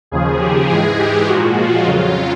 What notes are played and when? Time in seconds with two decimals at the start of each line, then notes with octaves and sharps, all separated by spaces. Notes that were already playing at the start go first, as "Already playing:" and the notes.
0.11 D#2 C#3 F3 G#4
0.40 G4
0.69 G#2 E3 G#3 G#4
0.99 G4
1.27 A#2 F3 G#3 F#4
1.57 F4
1.86 F2 C#3 F#3